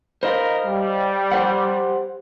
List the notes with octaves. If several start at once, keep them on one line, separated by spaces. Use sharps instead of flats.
D#4 A#4 C5 D#5 F5 B5
G3
G4 C5 F#5